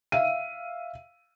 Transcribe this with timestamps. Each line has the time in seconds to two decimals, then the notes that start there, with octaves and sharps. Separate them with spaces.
0.12 E5 F5 D#7